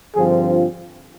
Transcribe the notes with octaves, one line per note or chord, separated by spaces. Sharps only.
G2 D3 F3 C4 G#4
F4